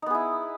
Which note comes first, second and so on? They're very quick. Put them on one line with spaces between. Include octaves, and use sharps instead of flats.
D#4 B3 G#4 E4